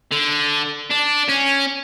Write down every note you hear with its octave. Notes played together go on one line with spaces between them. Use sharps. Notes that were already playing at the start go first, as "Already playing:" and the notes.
D3
D4
C#4